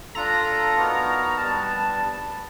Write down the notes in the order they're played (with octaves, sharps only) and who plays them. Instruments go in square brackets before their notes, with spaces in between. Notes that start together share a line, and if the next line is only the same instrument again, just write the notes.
[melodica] D4 F4 A4 [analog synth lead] A#5
[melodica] B3 D#4 F#4 A#4
[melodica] G3 B3 D4 [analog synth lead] A5